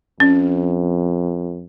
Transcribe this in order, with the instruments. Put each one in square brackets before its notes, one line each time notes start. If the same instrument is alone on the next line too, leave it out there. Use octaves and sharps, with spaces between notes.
[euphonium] F2 [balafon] C#4